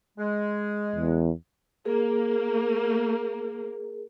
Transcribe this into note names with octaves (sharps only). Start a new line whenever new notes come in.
G#3
E2
A#3 G#4 A#4